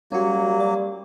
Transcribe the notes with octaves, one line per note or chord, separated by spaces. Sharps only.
F#3 G3 A#3 C#4 F#4
D5